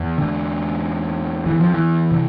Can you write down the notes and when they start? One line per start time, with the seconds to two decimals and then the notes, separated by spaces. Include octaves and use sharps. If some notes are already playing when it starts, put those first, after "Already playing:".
Already playing: E2
0.18 D3
1.46 E3
1.60 F3
1.74 E3
2.12 C3